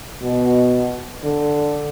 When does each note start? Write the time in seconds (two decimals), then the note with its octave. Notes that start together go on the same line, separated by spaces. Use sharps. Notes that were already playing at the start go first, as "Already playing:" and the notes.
0.22 B2
1.24 D3